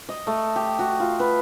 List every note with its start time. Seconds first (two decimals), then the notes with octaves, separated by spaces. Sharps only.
0.09 D#5
0.27 A3
0.56 G4
0.79 F#4
1.00 F4
1.20 B4